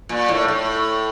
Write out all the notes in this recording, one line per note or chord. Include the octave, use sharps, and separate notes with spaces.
A#2
A2
A2